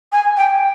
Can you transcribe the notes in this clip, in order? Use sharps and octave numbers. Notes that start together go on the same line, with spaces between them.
G#5
G5